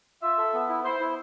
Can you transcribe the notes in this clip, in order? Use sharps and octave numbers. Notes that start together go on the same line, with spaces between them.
F4 E5
A4
B3
E4
E4 C5
E4